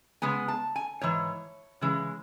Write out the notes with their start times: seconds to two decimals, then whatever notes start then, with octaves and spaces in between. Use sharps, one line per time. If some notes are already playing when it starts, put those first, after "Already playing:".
0.22 C#3 G#3 B3 G#5
0.48 A5
0.76 G#5
1.01 G#2 E3 C#5
1.81 C#3 E3 G#3